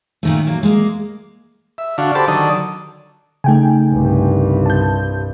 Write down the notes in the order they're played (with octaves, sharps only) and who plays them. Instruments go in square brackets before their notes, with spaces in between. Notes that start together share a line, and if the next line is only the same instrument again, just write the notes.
[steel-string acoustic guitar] A#2 D#3 A3
F#3 A#3
G#3 A#3
[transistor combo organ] E5
D3 D4 F#4 F5
G4 A4 C5 A5 B5 D6
D3 D#3 F#3 A4 D5 D#6
[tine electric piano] C#3 D#4 [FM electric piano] A3 G5 G#5
[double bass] C2 G2
[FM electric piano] A5 G6